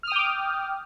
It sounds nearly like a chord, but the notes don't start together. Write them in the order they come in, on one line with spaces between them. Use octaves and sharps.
F6 D#6 G5 D6